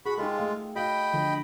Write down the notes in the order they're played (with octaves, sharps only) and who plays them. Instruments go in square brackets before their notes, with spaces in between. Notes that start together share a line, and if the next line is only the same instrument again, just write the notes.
[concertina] F#4 B5 [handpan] G#4
[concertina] G#3 F4 [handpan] D#4 G4 A4
[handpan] A3 F5
[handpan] F#4 F5 [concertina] D#5 G5 B5
[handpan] D3 F3